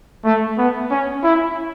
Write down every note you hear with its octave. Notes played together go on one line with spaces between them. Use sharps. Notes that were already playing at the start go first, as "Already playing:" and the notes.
A3
B3
C#4
E4